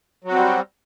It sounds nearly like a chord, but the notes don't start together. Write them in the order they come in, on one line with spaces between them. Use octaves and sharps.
F#3 F#4 C4 G3